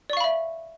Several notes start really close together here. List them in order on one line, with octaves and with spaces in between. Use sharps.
D5 C#6 F5 B5 E5